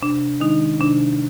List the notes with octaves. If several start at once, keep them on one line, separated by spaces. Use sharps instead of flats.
C3 D4
D#3 G#3 D4 D#4
C3 D4